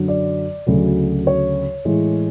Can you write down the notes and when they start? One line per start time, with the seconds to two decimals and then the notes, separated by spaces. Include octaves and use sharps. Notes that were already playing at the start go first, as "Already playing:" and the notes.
Already playing: F#2 D3 F#3
0.08 D5
0.67 D2 C#3 F#3
1.27 C#5
1.85 A2 E3 G#3